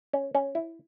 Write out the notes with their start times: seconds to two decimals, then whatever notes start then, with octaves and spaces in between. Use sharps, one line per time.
0.13 C#4
0.35 C#4
0.55 E4